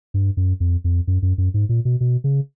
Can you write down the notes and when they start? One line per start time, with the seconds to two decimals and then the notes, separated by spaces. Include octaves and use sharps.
0.14 G2
0.37 F#2
0.60 F2
0.84 F2
1.07 F#2
1.22 F#2
1.38 F#2
1.54 G#2
1.69 A#2
1.85 B2
2.00 B2
2.24 C#3